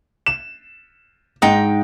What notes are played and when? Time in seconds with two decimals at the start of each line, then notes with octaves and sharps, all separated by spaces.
0.26 E7
1.42 G#2 D#4 G5